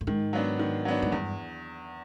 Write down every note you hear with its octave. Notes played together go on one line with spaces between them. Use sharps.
A2
G#2 D#3
F#3 B3 D4
D#3
F#3 B3 D4
G#2
E2 G2